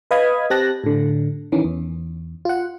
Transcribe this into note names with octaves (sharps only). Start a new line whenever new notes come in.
B4 D#5 F5 B5 D#6 G#6
C4 G4 G5 A5 F#6 A#6
A2 D3
D#3 E3 C#4
E2
F4 F#5